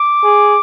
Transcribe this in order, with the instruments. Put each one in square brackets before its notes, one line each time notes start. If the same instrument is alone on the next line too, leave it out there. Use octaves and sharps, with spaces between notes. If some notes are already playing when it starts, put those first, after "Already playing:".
Already playing: [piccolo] D6
[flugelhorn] G#4